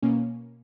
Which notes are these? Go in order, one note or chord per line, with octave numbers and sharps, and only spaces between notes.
B2 A#3 C#4